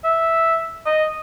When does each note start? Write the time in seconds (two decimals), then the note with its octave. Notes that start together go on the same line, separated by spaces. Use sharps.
0.04 E5
0.86 D#5